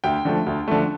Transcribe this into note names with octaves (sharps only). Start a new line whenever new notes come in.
D2 G5
D3 F3 A3
D2
D3 F3 A3